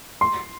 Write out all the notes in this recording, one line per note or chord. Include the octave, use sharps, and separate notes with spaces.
C6